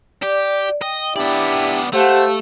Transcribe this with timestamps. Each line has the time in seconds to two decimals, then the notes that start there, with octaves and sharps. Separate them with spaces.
0.22 G4 D5
0.82 D#5 G5
1.16 B3 D4 E4 G4 D5
1.93 A3 G4 C5 F5 F#5 A5